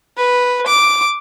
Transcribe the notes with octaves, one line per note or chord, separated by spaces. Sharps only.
B4
D6